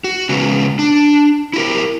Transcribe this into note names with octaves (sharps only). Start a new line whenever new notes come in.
F#4
C#3 G#3 B3 C#4
D4
E4 G4 A#4